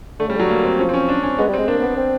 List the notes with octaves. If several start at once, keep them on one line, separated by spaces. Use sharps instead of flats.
D3 A3
C#3 G3
D3 F#3
A#3
C4
F3 C#4
C4
C#4
D4
C#4
G#3 B3
G3
C4
G#3
A#3 D4
A#3
B3
C4